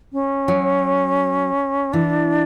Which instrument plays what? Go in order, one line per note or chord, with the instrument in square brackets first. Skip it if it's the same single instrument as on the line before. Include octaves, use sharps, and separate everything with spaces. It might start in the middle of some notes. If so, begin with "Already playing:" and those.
[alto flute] C#4
[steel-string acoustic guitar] F#3
[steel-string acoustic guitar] E3 [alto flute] D4